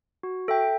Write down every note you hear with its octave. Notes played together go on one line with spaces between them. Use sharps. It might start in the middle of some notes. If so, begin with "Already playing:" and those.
F#4
A4 E5 G5